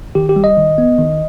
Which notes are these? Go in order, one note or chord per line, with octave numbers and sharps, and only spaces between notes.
D#3 G4
G4
G3
D#5
D#3
B3
D#3